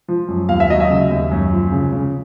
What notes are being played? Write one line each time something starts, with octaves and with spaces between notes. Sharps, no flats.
F3
F#2
D#2 F5
E5
F#3 D#5
E5
C#3
D#2
F#2
F3
C#3
C#3